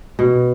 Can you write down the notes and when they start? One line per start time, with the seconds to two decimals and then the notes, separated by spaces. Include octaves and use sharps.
0.19 B2